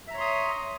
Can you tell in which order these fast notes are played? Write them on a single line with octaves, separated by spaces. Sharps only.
E5 A#5 C#5 C6 D#6